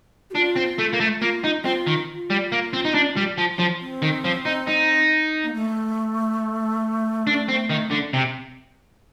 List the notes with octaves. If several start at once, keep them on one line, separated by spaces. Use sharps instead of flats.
G4
D4 F4
C4
A3
A#3
A3
A#3 F4
D#4
C4 F4
D#3
F4
G3
A#3
C4
D#4
D4
G3
F3
F3
C4
D#3
F3
D#4
D#4
A#3
A3
D4
C4
D#3
D3
C3